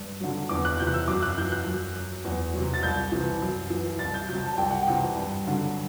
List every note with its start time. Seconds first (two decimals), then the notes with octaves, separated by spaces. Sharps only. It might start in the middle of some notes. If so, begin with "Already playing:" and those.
Already playing: G2
0.20 D3 F#3
0.49 E2 D6
0.65 F#6
0.79 C3 E3 G6
0.87 F#6
0.93 E6
1.08 F#2 D6
1.22 F#6
1.38 E3 G6
1.52 F#6
1.67 F#2
1.95 F#3
2.24 E2
2.54 C3 F#3
2.74 A6
2.83 C2 G6
3.12 C3 E3
3.42 F#2
3.70 E3
3.99 C2 A6
4.14 G6
4.28 C3 F#3 G6
4.44 A5
4.57 C2 G5
4.70 F#5
4.82 G5
4.87 C3 E3
5.17 G2
5.46 D3 F#3